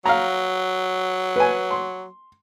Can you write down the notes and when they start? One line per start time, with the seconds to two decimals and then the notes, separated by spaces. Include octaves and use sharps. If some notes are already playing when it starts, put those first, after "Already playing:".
0.06 F#3 F5 A#5
1.36 B4 G#5
1.71 C6